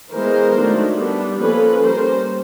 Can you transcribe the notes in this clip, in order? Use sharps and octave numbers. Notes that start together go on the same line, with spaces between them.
E3 G#3 B3 A#4 C5
D#3 F#3 A3 D4
G3 B3 D4
F3 A#3 C#4 A4 B4
G3 A#3 C#4 A#4 C5